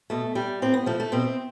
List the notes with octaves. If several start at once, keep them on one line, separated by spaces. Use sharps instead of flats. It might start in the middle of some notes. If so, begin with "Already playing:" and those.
B2 A3
G3
A2 C4
B3
F3 A3
A3
B2 C4